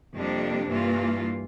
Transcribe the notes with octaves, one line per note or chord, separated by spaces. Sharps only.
F2 C3 G3 A#3 D4
G2 E3 A#3 F4